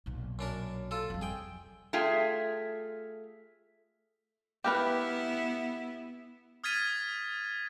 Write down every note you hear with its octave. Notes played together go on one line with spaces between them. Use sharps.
B1 A#2
F#2 D4 A#4
F4 A4
F2 G3
G#4 G5
A3 F4 G#4 G5
B3 E4 G4 A#4 B4
D#6 F6 G#6 A6 B6 D#7